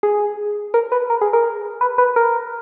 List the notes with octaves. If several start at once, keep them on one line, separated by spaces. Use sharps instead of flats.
G#4
A#4
B4
A#4
G#4
A#4
B4
B4
A#4